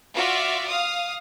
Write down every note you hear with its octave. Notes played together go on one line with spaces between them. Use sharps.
F4 F#4 D5 E5 F5
F5 D#6